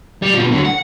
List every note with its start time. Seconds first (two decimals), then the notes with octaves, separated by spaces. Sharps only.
0.22 G3
0.34 B2 F3
0.52 D3 F#3
0.65 F#5